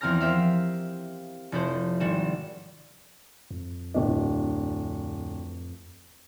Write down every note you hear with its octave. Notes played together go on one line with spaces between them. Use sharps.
E2 F3 C4 A#5 F6 A#6
G4 A#4 C5 E5 F5
F1 E4 A4 C5
G#1 G3 C4 F#4 E7
F2
D1 D4